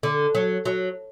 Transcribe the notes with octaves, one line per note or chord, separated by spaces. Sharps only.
D3
F#3
F#3